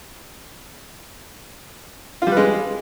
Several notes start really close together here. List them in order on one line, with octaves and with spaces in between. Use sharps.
F4 G3 B4 G#3